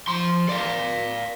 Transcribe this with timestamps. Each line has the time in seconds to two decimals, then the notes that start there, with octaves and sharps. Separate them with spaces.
0.08 F3 C6
0.49 D5 F5